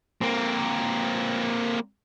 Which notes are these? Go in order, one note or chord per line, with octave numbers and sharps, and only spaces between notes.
A#3 C4